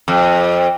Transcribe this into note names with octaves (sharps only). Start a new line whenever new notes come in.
F2